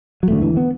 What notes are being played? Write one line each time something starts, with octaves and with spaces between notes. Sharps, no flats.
F#3
E1 D2 D3 A3
E3
B3